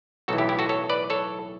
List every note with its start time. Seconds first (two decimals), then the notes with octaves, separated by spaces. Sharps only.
0.28 B1 A2 E3 F#4 A4
0.38 E4 G4
0.49 E4 G4
0.59 F#4 A4
0.69 A4 C#5
0.89 B4 D5
1.10 A4 C#5